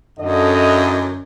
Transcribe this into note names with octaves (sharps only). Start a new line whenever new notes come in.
F#2 A2 D3 D#5